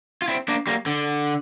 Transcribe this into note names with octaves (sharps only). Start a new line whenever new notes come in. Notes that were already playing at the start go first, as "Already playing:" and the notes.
F4
C4 E4
A#3 D4
G3 A#3
D3